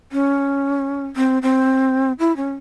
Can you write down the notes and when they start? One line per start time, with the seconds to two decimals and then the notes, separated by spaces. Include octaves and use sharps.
0.12 C#4
1.16 C4
1.42 C4
2.19 E4
2.36 C#4